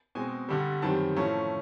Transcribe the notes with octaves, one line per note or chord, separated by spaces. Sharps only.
B2 G#3 C4 G#5
G2 D3 G3
F#2 D#3 G3 C4 A5
A2 F3 A3 C#4 A#5